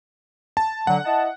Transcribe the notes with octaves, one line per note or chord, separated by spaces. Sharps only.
A5
D3 F#3 F#5
E4 D#5 A5